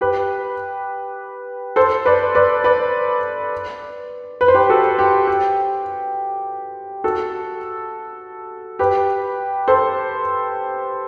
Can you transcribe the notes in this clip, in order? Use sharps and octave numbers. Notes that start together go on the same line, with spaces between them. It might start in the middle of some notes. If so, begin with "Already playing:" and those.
G4 B4
A4 C5
B4 D5
B4 D5
B4 D5
B4
C5
G4 B4
F#4 A4
G4
G4
F#4 A4
G4 B4
A4 C5